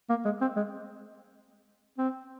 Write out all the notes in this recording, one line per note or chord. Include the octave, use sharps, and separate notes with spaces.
A#3
G#3
C4
G#3
C4